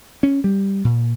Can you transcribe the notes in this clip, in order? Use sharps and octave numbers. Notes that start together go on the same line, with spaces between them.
C#4
G3
A#2